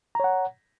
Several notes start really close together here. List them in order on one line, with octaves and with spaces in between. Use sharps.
A#5 C#5 F#5